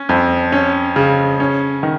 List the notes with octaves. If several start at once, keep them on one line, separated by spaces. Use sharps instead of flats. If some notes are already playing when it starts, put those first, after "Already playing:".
Already playing: C#4
F2
C#4
C#3
C#4
D#3